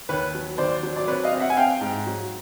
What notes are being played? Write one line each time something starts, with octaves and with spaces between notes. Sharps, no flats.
D#2 B4 C#5
F#3
D#2 C5 D5
F#3
D5
C4 B4 C#5
D#5 F5
C4
E5 F#5
G#5
C4 F5 G5
G#2
F#3